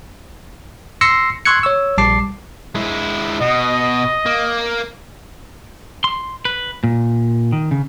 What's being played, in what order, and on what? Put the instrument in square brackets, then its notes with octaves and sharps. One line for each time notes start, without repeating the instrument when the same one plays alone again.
[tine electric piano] C6 E6 A#6 C7 C#7
C6 C#6 E6 F#6 G#6 C#7
C#5 C#6 E6
A#1 G3 A5 D6 C7
[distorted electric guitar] G#3 E4
[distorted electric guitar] B2 [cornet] D#5
[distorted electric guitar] A#3
[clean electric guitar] C6
B4
A#2
D#3
C#3